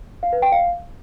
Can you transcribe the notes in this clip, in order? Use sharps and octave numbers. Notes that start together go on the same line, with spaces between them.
F5
B4
G5
F5